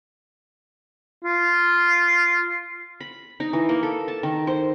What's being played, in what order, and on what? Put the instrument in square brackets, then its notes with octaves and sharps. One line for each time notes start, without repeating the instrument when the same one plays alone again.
[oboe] F4
[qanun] B5
D#4
E3
A#3
A4
A5
D#3
C5